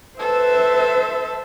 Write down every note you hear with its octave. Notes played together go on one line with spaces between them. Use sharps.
A4 B4 C5 E5